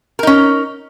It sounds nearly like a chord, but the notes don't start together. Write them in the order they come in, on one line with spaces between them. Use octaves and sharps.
A#4 D#4 C#4